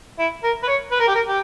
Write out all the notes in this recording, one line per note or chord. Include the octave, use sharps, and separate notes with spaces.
E4
A#4
B4
C#5
B4
A#4
G4
A#4
G4